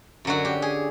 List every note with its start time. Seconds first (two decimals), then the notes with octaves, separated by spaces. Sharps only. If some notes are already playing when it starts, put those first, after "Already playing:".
0.25 F#2 D3 F#3 F#4
0.45 G4
0.62 G#4